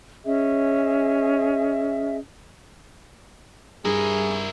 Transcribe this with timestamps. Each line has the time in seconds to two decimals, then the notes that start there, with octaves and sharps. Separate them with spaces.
0.25 C#4 G#4 D#5 E5
3.85 G2 E4 G#4 A#4